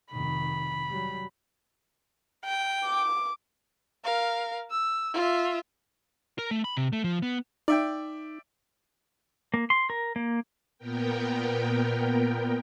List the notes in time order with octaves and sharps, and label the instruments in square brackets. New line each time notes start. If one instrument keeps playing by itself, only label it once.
[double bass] F1 D#3 [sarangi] B5
[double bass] F#3 G3
[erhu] G5
[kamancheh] D6
A#4 F5
E6
F4 E5
[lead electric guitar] A#4
A3
B5
C3
A3
F3
B3
[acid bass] D#4 [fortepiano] D5 E5 G5
[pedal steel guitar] A#3
C6
A#4
A#3
[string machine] A#2 B3 A#4 G5